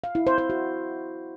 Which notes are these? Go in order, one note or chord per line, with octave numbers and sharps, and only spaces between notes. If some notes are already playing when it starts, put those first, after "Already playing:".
F5
E4
C5
C5
F#4